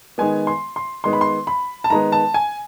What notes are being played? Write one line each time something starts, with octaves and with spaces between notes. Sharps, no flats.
D#3 G#3 B3 G#5
C6
C6
D#3 G#3 B3 C6
B5
C6
B5
A5
D#3 G#3 B3 A#5
A5
G#5